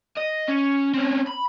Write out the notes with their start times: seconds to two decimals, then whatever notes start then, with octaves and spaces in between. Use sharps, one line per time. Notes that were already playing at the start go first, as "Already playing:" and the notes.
0.17 D#5
0.48 C#4
0.94 C4 C#4
1.27 B5